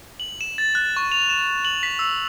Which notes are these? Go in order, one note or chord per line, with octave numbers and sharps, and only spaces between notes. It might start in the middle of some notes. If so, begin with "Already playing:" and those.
F#7
E7
A6
F#6
C#6
F7
E7
F#7
B6
E6